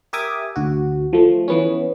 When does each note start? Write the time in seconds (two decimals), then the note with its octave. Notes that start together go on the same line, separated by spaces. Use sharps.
0.13 G4 A#4 E5 G#5 D6 D#6
0.56 D2 F#4
1.13 F3 A3
1.48 E3 B3 C#4